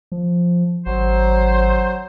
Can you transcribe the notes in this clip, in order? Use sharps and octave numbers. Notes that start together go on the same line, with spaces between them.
F3
G#1 F#3 C5